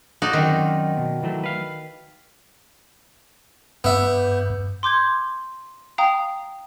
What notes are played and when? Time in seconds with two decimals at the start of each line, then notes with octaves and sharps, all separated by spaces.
0.22 D#4 F#4 D5
0.33 F#2 D#3 C4 F4
0.97 B2
1.23 E3 F#3 A3
1.44 B4 F5
3.84 G2 B3 E5
4.83 C6 D6 G6 G#6
5.98 F5 G5 A#5 D#6